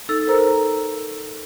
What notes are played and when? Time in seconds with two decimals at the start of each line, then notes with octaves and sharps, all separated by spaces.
0.09 D#4 A4 E6 A6
0.27 A4 A#4 C5 A#5 E6